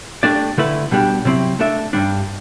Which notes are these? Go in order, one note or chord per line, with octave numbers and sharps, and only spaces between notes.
A3 D4 G4 D5
D3 A3 E4 B4
B2 G3 D4 G4
C3 F#3 C4 E4
A3 D4 A4 E5
G2 E3 G3 D4